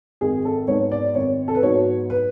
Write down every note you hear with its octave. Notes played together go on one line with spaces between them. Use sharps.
G#1 G#4
A4
G#2 G#3 B3 C#5
D5
G#1 C#5
A4
B4
G#2 F#3 B3 C#5
B4